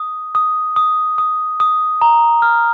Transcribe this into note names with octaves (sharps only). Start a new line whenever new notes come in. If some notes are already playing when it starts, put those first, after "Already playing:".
Already playing: D#6
D#6
D#6
D#6
D#6
A#5
F6